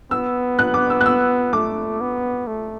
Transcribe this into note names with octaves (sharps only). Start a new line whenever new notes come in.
B3 E6
F#6
D6
E6
F#6
E6
A3 D6
B3
A3